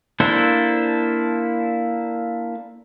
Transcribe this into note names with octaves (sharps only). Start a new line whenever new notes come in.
A#3 D4 E4 A4 C5